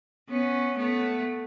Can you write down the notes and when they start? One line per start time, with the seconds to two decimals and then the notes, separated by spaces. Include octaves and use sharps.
0.29 B3 C#4
0.78 A3 B3